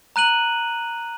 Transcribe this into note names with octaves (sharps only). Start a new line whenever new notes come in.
A#5 F#6 D#7 F#7